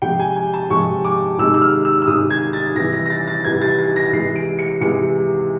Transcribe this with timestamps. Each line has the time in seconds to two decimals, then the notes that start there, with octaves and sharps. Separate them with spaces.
0.02 C3 F3 G#3 G5
0.19 G#5
0.36 G#5
0.54 A5
0.70 C3 F3 G#3 C#6
1.05 D6
1.39 C3 D#3 G#3 E6
1.54 E6
1.62 F6
1.85 E6
2.02 E6
2.07 C3 D#3 G#3 D#6
2.30 G#6
2.53 A6
2.76 C3 E3 G3 A#6
2.93 A#6
3.06 A#6
3.10 A6
3.28 A6
3.45 C3 E3 G3 G#6
3.61 A6
3.78 A6
3.96 A#6
4.13 C3 E3 G#3 C7
4.36 D7
4.59 C#7
4.81 C3 E3 G#3 C#7